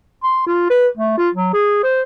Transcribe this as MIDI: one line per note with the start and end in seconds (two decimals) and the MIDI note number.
0.23 0.46 84
0.47 0.69 65
0.70 0.88 71
0.97 1.13 57
1.17 1.29 65
1.35 1.51 54
1.53 1.79 68
1.83 2.02 72